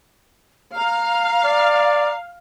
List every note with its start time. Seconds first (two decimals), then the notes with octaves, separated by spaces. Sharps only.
0.76 F5 A#5
1.45 D5